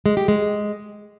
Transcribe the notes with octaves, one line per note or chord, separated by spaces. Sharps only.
G#3
G4
G#3